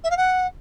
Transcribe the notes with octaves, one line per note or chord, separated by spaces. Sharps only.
E5
F5
F#5